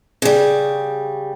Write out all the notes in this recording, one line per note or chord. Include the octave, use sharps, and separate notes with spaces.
C#3 G3